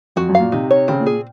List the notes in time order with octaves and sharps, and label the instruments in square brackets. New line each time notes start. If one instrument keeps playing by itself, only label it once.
[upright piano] F2 [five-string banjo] F#4
[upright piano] F#2
[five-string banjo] F5
[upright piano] A#2
[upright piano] C3 [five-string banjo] D#4
[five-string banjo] C#5
[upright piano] C#3 [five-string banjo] C4
[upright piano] A#2
[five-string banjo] G#4